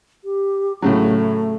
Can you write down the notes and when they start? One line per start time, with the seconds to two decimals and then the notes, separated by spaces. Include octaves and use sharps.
0.24 G4
0.82 A2 C#3 F#3 A3